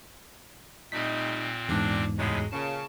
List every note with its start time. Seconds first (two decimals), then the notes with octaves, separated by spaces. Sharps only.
0.92 A#2 G3 A3 C4 D#4 B6
1.69 E2 G#2 D4
2.18 D2 A2 C3 F#3 G#3
2.51 A#2 C#3 A5